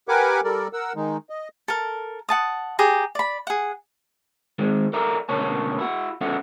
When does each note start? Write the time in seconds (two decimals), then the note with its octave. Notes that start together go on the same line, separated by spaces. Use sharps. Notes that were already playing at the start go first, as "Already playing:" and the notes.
0.08 G4 A#4 B4 F#5 G#5 D6
0.44 G3 A4 A#4 D5
0.73 A#4 F#5 E6
0.96 D#3 G#3 D#4
1.30 D#5
1.68 A4 A#4
2.29 F#5 A5 D#6
2.79 G4 G#4 A#5
3.15 D5 B5
3.47 G#4 F#5
4.59 D#3 G#3 C4
4.93 A4 A#4 D5 E5 A#5
5.29 D2 B2 A#3 C#4 C#5 A5
5.78 E4 F#4
6.21 E2 C#4 A4 E5 F#5